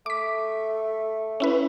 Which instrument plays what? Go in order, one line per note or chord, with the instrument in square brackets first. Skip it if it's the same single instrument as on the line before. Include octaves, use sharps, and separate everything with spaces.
[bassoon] A3 [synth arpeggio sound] D6 B6
[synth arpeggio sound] C#4 E4 B4